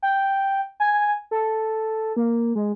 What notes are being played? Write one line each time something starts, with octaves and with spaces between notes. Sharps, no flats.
G5
G#5
A4
A#3
G#3